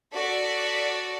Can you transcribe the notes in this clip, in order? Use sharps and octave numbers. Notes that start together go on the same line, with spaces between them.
F#4 A4 D5 B6